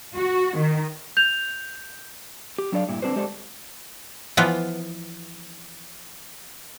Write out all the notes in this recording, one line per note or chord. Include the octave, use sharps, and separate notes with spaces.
F#4
D#3
G6 F7
G4
F#3 D4 A4 D5 F5
G2 A#2 E4
D3 C4 D4 G4 B4 C5
G#3 G4 A4 C5 D5
E3 F3 B3 F4